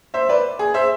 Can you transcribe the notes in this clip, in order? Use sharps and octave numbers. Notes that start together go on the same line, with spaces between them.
C5 E5
B4 D5
G#4
C5 E5